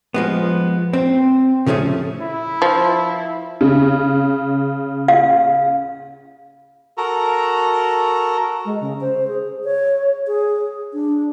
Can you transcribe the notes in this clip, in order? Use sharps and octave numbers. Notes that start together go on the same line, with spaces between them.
F3 G#3 B3
C4
C#3 F3 A3 C#4 G#4
E4
F3
C#3
F5
F#4 A4 A#4 A#5
G#3
C#3
C5
G#4
C#5
G#4
D4